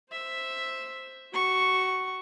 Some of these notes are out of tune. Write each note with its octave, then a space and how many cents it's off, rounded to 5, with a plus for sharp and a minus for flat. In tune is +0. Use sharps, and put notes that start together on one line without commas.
C5 +5 E5 +0
F#4 +25 C#6 +0